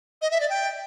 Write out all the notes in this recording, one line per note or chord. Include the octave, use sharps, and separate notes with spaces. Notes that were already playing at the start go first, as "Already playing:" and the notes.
D#5
E5
D5
G5